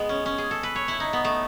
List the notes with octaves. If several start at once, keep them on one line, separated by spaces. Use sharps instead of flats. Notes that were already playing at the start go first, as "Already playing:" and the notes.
Already playing: G#3 B3
C#4
C#4
G#4
A4
B4
C#5
E4
D#4
B3
A3